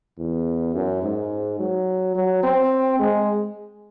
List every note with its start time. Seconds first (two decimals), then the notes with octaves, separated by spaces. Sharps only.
0.18 E2
0.74 F#2
1.03 G#2
1.59 F#3
2.15 F#3
2.43 C4
2.99 G#3